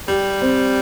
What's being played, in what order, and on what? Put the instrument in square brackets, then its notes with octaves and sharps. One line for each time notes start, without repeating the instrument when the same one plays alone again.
[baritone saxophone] G3 [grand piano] G4
[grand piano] C4